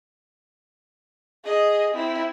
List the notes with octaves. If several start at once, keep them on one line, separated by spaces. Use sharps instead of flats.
G#4 D#5
C4 E4